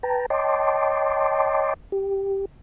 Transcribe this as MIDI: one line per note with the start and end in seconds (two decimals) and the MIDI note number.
0.03 0.26 71
0.03 0.26 79
0.03 0.26 81
0.03 0.26 82
0.30 1.74 73
0.30 1.74 75
0.30 1.74 79
0.30 1.74 81
0.30 1.74 84
0.30 1.74 86
1.92 2.45 67